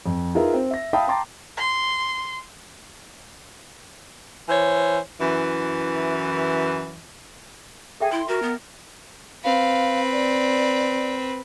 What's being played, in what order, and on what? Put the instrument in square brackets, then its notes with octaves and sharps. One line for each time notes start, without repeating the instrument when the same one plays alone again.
[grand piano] F2
D#4 F4 G#4 A#4 B4 E5
C4
E5 A#6
E5 F5 G5 A5 B5 D#6
G5 A5 A#5 C6 D6 A6
[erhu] C6
[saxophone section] E3 C5 C#5
F#2 E3
[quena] G#4 [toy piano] A4 E5 G5
[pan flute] E4 [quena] C6
[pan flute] F#4 [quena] A#4
[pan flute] B3
[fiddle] C4 B4 [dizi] F5
[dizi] D5